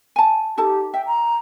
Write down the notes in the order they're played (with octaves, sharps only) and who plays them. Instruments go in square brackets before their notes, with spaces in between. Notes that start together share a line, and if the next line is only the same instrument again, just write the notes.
[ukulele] G#5 A5
[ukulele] D#4 A4 A5 [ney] G4
[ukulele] E5 [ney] G5
[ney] A#5